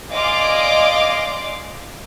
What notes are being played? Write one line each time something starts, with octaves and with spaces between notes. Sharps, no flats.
D5 D#5 F5 G#5 C6 D6